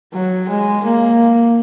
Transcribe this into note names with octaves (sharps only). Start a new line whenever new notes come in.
F#3
G#3
A#3